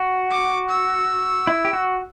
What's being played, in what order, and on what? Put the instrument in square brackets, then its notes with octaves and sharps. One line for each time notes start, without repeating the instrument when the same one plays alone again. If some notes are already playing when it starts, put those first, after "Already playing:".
Already playing: [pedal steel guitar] F#4
[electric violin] D6
E6
[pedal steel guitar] E4
G4
F#4